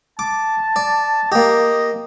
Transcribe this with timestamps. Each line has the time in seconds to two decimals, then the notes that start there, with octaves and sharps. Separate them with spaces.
0.19 A5 D6
0.76 D5
1.32 A#3 G4 D#5